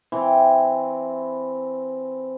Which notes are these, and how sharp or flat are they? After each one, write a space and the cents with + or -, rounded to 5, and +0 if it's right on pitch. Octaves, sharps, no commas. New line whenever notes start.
E3 +5 C4 -5